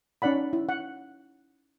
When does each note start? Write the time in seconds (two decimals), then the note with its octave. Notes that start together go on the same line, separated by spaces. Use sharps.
0.22 C#4 D#4 D5 F#5 B5
0.53 E4
0.69 F#5